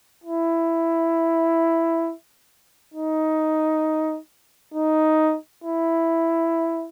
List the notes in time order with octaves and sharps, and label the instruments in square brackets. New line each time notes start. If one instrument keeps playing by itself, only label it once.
[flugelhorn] E4
D#4
D#4
E4